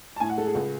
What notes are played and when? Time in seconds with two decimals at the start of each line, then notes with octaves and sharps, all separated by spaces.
0.16 A5
0.20 A2 G#5
0.29 F#5
0.38 G#3 A4
0.46 G#4
0.55 C#2